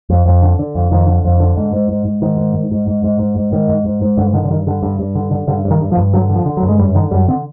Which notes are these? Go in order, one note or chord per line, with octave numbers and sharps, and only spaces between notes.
F2
F2
D3
D3
F2
F2 D#3
D3
F2
D3
G#2
G#2
G#2
G#2
G#2 D#3
G#2
G#2
G#2
G#2
G#2
G#2
G#2
G#2 D#3
G#2
G#2
G#2
G2 D3
D3 D#3
D3
G2 D#3
G2 D3
G2
G2
D3
D3
G2 D3
G2
D#3
G2
F3
G2
D3 F#3
D3
F3
D3
F#3
G2
G#3
F#2 G3
D3 D#3
F#2 G3
D3 C4